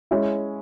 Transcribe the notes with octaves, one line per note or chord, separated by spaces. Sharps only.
G#3 C#4 E4